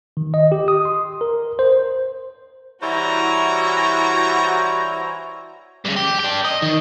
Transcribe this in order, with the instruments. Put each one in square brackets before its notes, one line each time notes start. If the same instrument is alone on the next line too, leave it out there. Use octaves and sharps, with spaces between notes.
[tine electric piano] D#3
D#5
G4
D#6
C6
A#4
C5
[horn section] E3 G3 A#5 [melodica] E4 C5 C#5 [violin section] F#4
[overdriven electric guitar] G2 C#3
G4
D4 G5
D#5
D#3